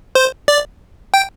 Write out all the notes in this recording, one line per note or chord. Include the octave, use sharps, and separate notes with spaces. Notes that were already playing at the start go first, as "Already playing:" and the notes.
C5
D5
G5